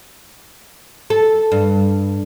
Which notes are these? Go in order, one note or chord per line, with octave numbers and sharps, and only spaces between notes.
A4
G2